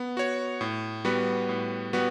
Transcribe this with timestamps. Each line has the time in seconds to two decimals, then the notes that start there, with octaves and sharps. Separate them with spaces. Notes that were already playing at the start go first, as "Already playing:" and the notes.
Already playing: B3
0.17 F#4 C#5
0.61 A2
1.05 G3 B3 F#4 B4
1.49 A2
1.93 G3 B3 F#4 B4